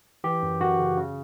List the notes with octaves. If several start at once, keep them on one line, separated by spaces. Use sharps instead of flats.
E3 G4
F#2
F#2 F#4
C#3
C#3